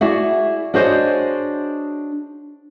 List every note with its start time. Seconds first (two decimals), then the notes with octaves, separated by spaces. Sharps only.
0.01 E4 F#4 G#4 D5
0.74 D4 F#4 G#4 C5 C#5 D#5